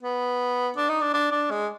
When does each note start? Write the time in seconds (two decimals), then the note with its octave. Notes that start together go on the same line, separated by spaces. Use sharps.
0.03 B3
0.76 D4
0.89 D#4
1.01 D4
1.13 D4
1.31 D4
1.50 G#3